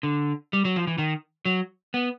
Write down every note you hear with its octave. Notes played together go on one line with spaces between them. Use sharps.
D3
G3
F#3
F3
E3
D#3
F#3
B3